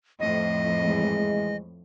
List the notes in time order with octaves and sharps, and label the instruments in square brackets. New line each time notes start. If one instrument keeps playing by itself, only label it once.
[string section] F2 A2 [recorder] D#5
[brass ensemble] E3 G#3